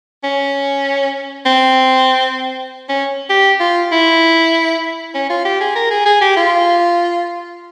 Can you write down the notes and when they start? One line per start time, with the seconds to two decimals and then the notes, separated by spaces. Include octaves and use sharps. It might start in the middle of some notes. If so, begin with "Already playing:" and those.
0.24 C#4
1.46 C4
2.89 C#4
3.30 G4
3.60 F4
3.92 E4
5.15 C#4
5.30 F4
5.45 G4
5.61 G#4
5.76 A#4
5.91 G#4
6.06 G#4
6.21 G4
6.37 F4